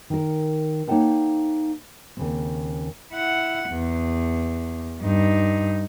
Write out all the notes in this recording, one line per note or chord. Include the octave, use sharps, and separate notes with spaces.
D#3 A#4
A#3 D#4 C#5 F#5 G5 A5
D#2 C#3 C4
E4 F#5
E2
G2 D#4